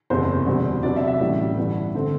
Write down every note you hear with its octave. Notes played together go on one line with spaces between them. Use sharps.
F#1 E2 C3 C5
E2 B2 G3 C4
C2 C3 F#3 B3 D4 D5
E5
E5
A1 A2 E3 G3
G2 E3 B3
D3 A3 C4